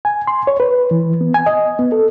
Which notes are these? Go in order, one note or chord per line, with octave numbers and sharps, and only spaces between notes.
G#5
C6
C#5
B4
E3
B3
G#5
D#5
B3
A4